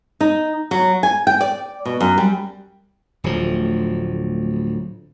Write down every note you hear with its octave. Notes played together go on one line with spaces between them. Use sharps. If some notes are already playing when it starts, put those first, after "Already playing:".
D#4
F#3
G#5
G5
D5
B2
F#2
G3
D1 D2 F3